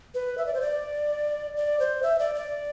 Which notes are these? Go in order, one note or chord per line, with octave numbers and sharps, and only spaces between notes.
B4
E5
D5
C5
D5
D5
C5
E5
D5
D5